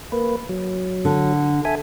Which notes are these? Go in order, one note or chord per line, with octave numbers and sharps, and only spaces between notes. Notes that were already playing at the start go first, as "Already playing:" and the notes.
A#3 B4
F#3
D3
A4 E5 G#5